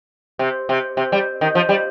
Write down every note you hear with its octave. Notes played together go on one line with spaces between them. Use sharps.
C3
C3
C3
G3
D#3
F3
G3